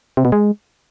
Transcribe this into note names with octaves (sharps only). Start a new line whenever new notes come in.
C3
B2
G#3